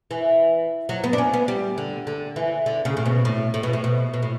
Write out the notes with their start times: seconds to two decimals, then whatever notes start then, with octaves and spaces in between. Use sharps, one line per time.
0.11 E3
0.89 F#3
1.04 B3
1.13 D4
1.18 C#4
1.34 B3
1.48 G3
1.78 D3
2.07 D3
2.36 E3
2.66 D3
2.85 C#3
2.97 A2
3.05 B2
3.25 A2
3.54 A2
3.63 B2
3.73 A2
3.84 B2
4.14 B2
4.22 A2